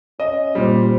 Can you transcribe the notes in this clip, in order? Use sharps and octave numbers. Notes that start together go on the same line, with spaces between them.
C#4 D#5
A#2 G3 C5